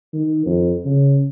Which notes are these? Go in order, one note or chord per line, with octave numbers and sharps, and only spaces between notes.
D#3
F2
C#3